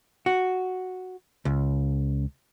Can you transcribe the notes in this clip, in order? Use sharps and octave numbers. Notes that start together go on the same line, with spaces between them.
F#4
C#2